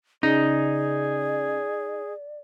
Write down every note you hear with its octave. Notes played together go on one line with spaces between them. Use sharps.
C#3 D#4 G#4 D5